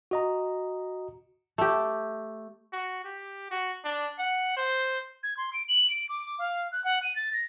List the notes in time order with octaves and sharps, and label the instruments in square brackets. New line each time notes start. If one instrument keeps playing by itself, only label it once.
[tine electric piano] F#4 D#5 A#5
[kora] A3 G4
[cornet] F#4
G4
F#4
D4
F#5
C5
[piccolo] G#6
C6
D7
F#7
D7
D6
F5
F#6
F#5
D#7
A6
A#6